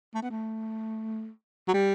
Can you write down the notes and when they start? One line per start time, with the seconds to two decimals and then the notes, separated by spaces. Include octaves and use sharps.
0.14 A3
0.22 B3
0.30 A3
1.68 F#3
1.73 G3